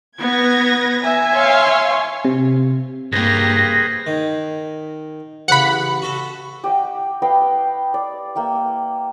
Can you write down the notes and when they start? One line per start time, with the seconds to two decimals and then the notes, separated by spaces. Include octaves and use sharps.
0.20 B3 B4 G#6 A#6
1.03 E5 G#5
1.34 C#5 F5 C6
2.25 C3
3.12 C#2 G2 A#3 G4 G#4 B4 C5 A#6
4.07 D#3
5.48 A1 C#3 F#5 B5
6.02 F#4 A4
6.64 G4 D#5 F#5
7.22 B4 D#5 F5 G5
7.94 D5
8.35 A#3 E5 G5